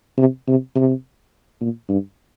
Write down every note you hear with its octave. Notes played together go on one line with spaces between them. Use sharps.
C3
C3
C3
A#2
G2